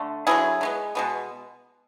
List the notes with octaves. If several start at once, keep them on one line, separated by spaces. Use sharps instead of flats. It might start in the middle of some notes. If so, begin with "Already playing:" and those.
Already playing: D3 A3
D3 F#3 B3 E4 G#4
D3 G#3 B3
B2 G#3 B3